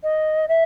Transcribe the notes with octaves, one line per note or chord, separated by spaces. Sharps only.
D#5
E5